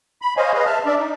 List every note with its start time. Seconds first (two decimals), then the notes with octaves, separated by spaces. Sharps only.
0.22 B5
0.37 C5 C#5 D#5 F5 G#5
0.54 G#4 B4 D#5 F5
0.66 E5 A5 F6
0.86 D4 D5 E5
0.98 D#4